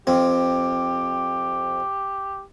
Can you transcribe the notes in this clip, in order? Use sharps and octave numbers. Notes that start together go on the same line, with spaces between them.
F2 C4 G4